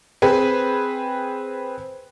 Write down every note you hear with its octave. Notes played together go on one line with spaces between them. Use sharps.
C4 G#4 B4